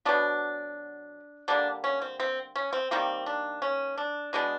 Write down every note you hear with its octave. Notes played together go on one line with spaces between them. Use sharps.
B2 F#3 B3 D4
D3 G3 A#3 D4
C#4
C4
C4
C#4
C4
D#3 G3 A#3 C4
D4
C#4
D4
B2 G#3 B3 D4